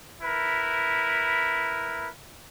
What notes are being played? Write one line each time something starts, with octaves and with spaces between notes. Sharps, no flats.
E4 A#4 B4